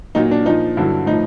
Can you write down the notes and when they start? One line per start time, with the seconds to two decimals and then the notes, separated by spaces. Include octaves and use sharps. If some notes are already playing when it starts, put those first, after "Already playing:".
0.15 A#2 F#3 D#4
0.31 D4
0.45 A#2 F3 D#4
0.77 G2 D3 F#3 E4
1.06 A2 F3 D#4